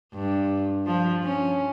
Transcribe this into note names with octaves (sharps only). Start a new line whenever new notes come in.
G2
F3
C#4